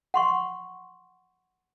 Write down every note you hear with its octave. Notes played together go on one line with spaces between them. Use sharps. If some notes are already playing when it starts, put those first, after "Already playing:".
F#5 C6 C#6